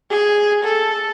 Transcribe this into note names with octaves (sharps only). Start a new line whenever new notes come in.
G#4
A4